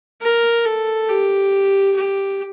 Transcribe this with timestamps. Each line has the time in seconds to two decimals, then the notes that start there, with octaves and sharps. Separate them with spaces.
0.22 A#4
0.65 A4
1.09 G4
1.95 G4